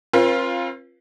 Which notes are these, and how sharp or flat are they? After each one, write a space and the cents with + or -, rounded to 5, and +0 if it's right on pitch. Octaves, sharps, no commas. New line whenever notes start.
C4 +40 F4 +0 B4 -40